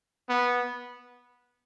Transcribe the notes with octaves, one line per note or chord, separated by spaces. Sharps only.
B3